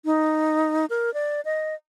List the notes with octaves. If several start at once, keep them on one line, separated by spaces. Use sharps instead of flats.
D#4
A#4
D5
D#5